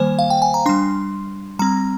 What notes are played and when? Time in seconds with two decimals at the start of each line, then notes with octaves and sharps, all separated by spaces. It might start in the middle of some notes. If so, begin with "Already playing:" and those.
Already playing: D#3 G3 A#3 C5 G#5
0.19 F5
0.30 G5
0.42 G#5
0.54 A#5
0.66 G3 D4 C6
1.59 G3 C4 A#5